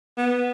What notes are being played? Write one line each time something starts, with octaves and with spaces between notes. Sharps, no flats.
B3